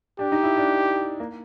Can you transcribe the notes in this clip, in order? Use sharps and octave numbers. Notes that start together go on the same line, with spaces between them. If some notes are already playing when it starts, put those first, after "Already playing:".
D4 G4
D#4
E4
D4
A#3